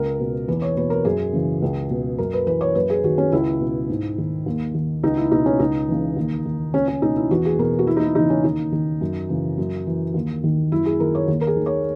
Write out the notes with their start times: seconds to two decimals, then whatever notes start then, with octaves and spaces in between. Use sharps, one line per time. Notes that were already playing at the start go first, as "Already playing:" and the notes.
Already playing: C#2 A#4
0.20 B2
0.48 E2 B4
0.62 C#5
0.76 B2 B4
0.90 A#4
1.05 F#2 G#4
1.33 C#3 E3
1.62 C#2
1.90 B2
2.18 F#2 A#4
2.33 B4
2.47 E3 B4
2.61 C#5
2.75 F#2 B4
2.90 G#4
3.04 D#3 F#4
3.18 C#4
3.32 C#2 E4
3.60 B2
3.90 G#2
4.18 D#3
4.46 D#2
4.74 D#3
5.03 C#2 D#4
5.17 E4
5.32 B2 D#4
5.46 C#4
5.59 C#2 D#4
5.88 C#3 E3
6.16 D#2
6.45 D#3
6.74 C#2 C#4
6.88 C#4
7.02 B2 D#4
7.16 E4
7.31 E2 F#4
7.45 G#4
7.58 B2 A#4
7.79 F#4
7.87 E2 E4
7.97 D#4
8.02 E4
8.15 C#3 E3 D#4
8.30 C#4
8.44 D#2 D#4
8.72 D#3
9.01 F#2
9.29 C#3 E3
9.58 F#2
9.87 E3
10.14 D#2
10.44 D#3
10.72 F#2 E4
10.86 G#4
11.00 D#3 A#4
11.15 C#5
11.28 D#2
11.41 A#4
11.47 G#4
11.56 D#3
11.66 C#5